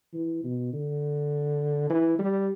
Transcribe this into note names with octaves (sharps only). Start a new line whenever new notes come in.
E3
B2
D3
E3
G3